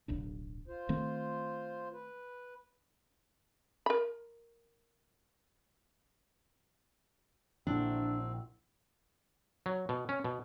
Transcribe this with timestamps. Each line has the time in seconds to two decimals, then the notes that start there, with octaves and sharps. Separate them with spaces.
0.08 D1 B1 D4
0.68 F4 C5
0.89 D#3 A3 C4
1.92 B4
3.86 A#4 B5
7.67 A#1 C4 D4 E4 F#4
9.66 F#3
9.89 B2
10.09 C#4
10.24 B2